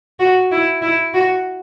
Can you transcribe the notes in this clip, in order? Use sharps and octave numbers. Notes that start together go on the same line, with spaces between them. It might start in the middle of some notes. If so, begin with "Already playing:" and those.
F#4
E4
E4
F#4